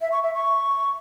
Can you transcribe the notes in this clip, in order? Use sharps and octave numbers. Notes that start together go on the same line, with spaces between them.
E5
C#6
E5
C#6